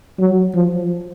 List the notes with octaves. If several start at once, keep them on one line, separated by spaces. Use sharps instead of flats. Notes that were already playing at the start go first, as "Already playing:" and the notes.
F#3
F3